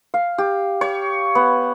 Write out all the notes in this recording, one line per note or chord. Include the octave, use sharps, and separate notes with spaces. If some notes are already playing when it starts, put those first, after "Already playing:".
F5
G4
C#5
B3